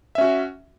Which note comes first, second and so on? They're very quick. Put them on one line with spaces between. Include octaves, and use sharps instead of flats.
E5 C#4 F#4